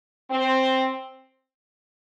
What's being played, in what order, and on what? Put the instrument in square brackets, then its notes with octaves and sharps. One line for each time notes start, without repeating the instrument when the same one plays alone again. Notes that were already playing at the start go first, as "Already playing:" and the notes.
[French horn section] C4